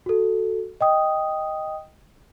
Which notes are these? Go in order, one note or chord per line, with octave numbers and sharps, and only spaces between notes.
F#4 A4
D#5 G5 D#6